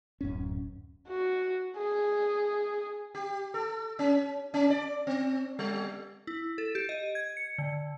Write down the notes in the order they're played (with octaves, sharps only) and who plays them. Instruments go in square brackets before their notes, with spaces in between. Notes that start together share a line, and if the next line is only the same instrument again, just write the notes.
[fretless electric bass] D1 F#2 C#4
[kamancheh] F#4
G#4
[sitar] G4
A4
C#4
C#4
D5
C4
G3
[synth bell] E4
A4
G4
D#5
G#6
C#7
D3